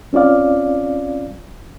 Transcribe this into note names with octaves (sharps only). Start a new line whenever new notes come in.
C4 C#4 F4 D5 F5